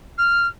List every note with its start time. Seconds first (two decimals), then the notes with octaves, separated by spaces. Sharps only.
0.18 F6